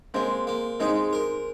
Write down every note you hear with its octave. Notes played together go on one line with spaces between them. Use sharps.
G#3 A#3 C4
A#3
G#3 C4 D#4
A#4